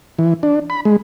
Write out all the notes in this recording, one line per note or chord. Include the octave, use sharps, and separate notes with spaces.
E3
D4
B5
G#3